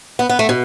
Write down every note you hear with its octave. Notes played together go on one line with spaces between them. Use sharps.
B3
B3
A3
B2